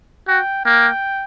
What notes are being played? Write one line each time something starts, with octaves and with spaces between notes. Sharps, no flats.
F#4 G5
A#3 G5